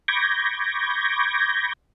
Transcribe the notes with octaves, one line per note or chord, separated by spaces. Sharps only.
B5 C#6 D6 G6 G#6 A#6